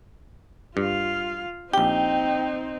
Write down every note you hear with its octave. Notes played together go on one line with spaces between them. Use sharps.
G2 F4 F5
A#1 C4 D#4 G4 G5